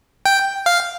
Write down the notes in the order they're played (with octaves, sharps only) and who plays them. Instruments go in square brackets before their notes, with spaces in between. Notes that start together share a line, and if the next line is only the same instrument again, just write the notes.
[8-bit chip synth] G5
F5